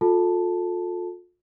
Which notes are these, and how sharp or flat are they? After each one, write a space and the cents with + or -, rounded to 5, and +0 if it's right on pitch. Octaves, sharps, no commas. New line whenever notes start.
F4 +35 A4 +0 A5 +0